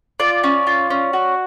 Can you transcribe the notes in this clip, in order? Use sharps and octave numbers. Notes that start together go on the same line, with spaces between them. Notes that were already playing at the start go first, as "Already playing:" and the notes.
F4 D5
C#4
F4
C#4
F#4